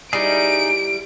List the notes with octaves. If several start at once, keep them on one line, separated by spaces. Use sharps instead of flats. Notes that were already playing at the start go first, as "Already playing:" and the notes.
G3 D#4 E4 G#4 D7